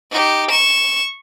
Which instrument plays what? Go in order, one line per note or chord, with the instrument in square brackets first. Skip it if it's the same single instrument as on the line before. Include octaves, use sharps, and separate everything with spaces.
[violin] D#4 G4
C#6 E7